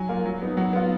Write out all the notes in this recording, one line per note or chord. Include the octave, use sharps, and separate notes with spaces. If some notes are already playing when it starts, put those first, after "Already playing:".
Already playing: F#3 G#5
A#3 F4
F#3
B3 D#4
F#3 F#5
B3 F4